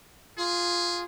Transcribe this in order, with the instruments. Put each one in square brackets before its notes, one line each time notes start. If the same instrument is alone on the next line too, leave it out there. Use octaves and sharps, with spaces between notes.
[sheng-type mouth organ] F4 [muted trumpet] G#4